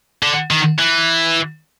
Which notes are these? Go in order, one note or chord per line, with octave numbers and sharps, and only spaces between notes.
D3
D#3
E3